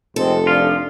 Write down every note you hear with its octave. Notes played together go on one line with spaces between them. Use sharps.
F1 G#3 C4 A4
F3 D4 F4